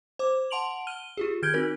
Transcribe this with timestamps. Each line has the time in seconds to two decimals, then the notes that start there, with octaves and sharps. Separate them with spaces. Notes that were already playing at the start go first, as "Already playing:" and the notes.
0.19 C5 D6
0.51 F#5 A5 C6 D7 F7 F#7
0.87 F6 D#7 G7
1.17 F4 G4 G#4
1.42 D#3 F6 G6 G#6 D7 G7
1.54 C4 D#4 F#4 A#4